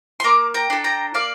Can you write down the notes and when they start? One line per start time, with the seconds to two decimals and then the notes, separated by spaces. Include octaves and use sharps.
0.20 C6
0.24 A#3 A#5 D6
0.54 G5 A#5
0.70 D4 A4
0.84 G5 A#5
1.14 A#3 D5 F5